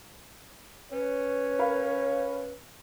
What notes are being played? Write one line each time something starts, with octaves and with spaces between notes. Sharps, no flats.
C#4 B4 C#5
A#4 F5 B5